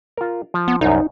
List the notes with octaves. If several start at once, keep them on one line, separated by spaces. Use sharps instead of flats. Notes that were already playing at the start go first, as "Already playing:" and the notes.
F4 A#4
F3
B3
C2 F#2 D#4